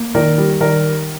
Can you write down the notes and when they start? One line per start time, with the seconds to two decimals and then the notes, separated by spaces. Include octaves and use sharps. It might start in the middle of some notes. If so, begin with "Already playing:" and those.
Already playing: A#3
0.15 D#3 A#4 D5
0.38 G3
0.60 D#3 A#4 D5